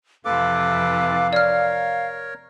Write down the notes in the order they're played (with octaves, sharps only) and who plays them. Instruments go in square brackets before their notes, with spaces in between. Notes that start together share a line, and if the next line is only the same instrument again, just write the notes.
[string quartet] F2 C3 E3 [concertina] A4 B4 D6 [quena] F5
[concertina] A#4 C#5 [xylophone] D5 F6